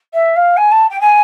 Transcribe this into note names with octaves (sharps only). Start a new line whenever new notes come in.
E5
F5
G#5
A5
G5
G#5